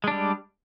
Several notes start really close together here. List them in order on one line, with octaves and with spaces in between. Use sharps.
G#3 D4 G3